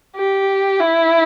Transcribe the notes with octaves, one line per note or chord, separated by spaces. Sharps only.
G4
E4